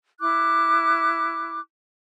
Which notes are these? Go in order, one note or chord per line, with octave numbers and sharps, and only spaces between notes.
E4 D6 F#6